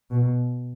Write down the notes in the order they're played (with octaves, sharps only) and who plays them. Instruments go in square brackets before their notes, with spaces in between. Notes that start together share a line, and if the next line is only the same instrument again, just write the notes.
[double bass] B2